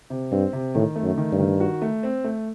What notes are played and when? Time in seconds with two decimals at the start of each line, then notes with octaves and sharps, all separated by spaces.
0.10 C3
0.32 G2 C4
0.53 C3
0.75 A2 D#3
0.96 A3
1.03 F#2
1.18 D#3
1.32 G2
1.39 D#3
1.60 F#4
1.82 A3
2.03 C4
2.24 A3